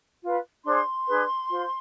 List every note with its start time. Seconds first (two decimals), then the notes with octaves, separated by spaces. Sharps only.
0.22 F4 B4
0.64 D4 G#4 C5 C6
1.06 D4 G#4 B4
1.49 F4 C5